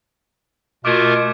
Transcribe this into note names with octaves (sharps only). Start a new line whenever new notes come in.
B2 A3 F4 A#4 D6 G#6